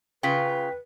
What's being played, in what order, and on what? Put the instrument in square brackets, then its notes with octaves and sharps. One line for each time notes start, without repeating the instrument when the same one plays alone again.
[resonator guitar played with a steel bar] C#3 F4 [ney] B4 [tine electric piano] G5 B6